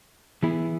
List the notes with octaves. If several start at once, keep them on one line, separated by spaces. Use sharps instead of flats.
E3 B3 E4 G#4